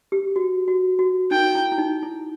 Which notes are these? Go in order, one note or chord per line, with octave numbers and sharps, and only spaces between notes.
G4
F#4
F#4
F#4
D#4 G5
E4
E4
D#4
E4